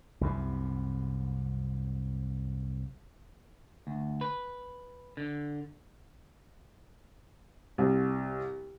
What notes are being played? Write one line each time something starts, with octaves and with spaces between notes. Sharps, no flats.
C2 F#2 C3
D2
B4
D3
C2